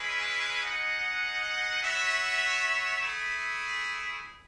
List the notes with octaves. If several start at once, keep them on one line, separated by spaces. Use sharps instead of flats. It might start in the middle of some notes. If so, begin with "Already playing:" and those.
Already playing: G#3 C#4 E4 G#4 B4
D#4 G#4 D#5 F#5
B3 F#4 C#5 E5
A3 E4 G#4